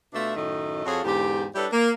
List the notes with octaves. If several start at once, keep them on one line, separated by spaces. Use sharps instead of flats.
B2 A3 D4 F4 E5
F#2 A2 D#3 A3 D#5
F2 F4 F#4 G#4 A4 C#5
E2 G#2 D3 G4
G3 D4 E4 A4 B4 C#5
A#3